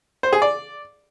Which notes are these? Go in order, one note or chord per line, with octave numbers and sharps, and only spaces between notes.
C5
G#4
D5